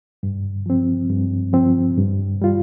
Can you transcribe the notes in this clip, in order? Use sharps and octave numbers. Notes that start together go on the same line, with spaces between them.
G2
F3 C4
G2
F3 C4
G2
G3 F4